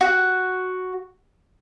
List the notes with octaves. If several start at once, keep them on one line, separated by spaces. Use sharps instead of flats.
F#4